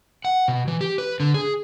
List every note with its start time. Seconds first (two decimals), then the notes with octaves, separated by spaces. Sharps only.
0.25 F#5
0.48 B2
0.68 E3
0.81 G4
0.98 B4
1.20 D3
1.34 G#4